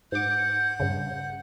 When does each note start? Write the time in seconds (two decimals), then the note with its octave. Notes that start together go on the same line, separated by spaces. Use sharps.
0.12 G#2 F#5 D6 G6
0.80 G2 C#3